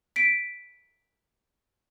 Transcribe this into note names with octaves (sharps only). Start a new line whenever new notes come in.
B6 D7